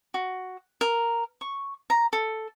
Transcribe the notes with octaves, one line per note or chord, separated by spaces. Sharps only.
F#4
A#4
C#6
A#5
A4